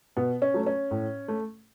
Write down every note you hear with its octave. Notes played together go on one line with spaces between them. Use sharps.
B2 B3
C#4
F#3 A3
C#4
A2
A3